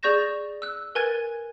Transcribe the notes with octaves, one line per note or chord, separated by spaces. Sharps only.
G#4 D5 C#6 G6 A#6 E7
E6 F#6
A#4 B4 G#5 F#6 G#6 A6